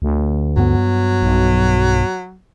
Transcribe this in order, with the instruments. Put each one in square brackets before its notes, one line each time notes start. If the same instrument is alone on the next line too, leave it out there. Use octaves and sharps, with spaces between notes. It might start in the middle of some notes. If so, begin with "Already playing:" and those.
[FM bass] D2
[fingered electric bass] G2 B3 [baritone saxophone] F#3
[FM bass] B1